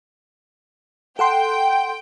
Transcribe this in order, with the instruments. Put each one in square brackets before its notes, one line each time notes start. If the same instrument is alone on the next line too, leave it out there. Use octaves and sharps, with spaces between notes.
[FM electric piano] A4 F#5 C6 [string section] G5